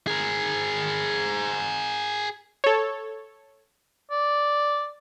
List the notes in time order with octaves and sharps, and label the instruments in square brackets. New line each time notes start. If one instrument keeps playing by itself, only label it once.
[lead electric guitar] G#4 A#4
[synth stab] A4 C#5
[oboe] D5